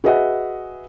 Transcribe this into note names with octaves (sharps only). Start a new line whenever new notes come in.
F#4 G#4 B4 D#5 E5 F#5